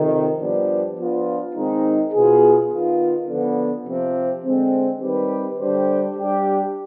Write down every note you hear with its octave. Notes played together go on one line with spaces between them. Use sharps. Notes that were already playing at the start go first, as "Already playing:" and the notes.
Already playing: F2 C3 D#3
G2 F3 B3 D4 G4
F3 B3 D4 F4
D#3 G#3 C4 D#4
B2 B3 F4 G#4
D#3 B3 F4
D3 F3 B3
C3 F3 C4
D3 G#3 C4
D#3 G3 C4 G4 B4
D3 G3 D4 G4 C5
G3 D4 G4